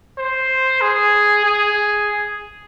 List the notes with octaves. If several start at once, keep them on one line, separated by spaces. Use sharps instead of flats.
C5
G#4
G#4